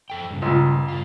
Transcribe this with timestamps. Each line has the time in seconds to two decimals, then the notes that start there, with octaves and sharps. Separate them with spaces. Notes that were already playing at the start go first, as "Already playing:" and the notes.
0.10 F2 A4 G5
0.31 G2 C#3
0.42 C#2 A#2
0.88 G2 F4